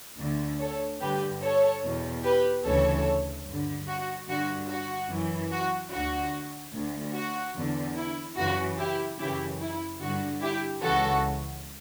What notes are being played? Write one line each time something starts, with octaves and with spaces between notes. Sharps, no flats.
D2 D3
A4 C#5
G2 D3 G4 B4
A4 C#5
E2 B2
G4 B4
D2 C#3 E3 A4 C#5
G2 D3
F#4
G2 D3 F#4
F#4
F#2 E3
F#4
D2 D3 F#4
D2 D3
F#4
E2 D3
E4
F#2 C#3 E3 F#4
E4 G4
F#2 C#3 E3 E4 G4
E4
G2 D3 F#4
E4 G4
C#2 C#3 E3 F#4 A4